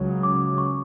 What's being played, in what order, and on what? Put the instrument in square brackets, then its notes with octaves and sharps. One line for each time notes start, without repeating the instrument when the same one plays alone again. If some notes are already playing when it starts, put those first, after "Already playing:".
Already playing: [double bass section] C#2 C#3 F#3
[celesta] D6
C#6